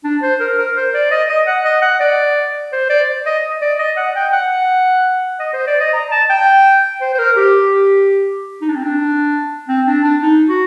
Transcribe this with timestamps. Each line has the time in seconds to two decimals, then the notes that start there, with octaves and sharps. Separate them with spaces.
0.04 D4
0.22 C5
0.40 A#4
0.58 A#4
0.76 C5
0.94 D5
1.11 D#5
1.29 D#5
1.47 F#5
1.65 D#5
1.82 F#5
2.00 D5
2.73 C5
2.90 D5
3.26 D#5
3.62 D5
3.79 D#5
3.97 F#5
4.16 G5
4.33 F#5
5.40 D#5
5.54 C5
5.67 D5
5.80 D#5
5.93 A#5
6.11 A5
6.30 G5
7.01 C5
7.14 C5
7.19 A#4
7.37 G4
8.61 D#4
8.69 D4
8.76 C4
8.84 D4
9.68 C4
9.87 D4
10.04 D4
10.22 D#4
10.49 F#4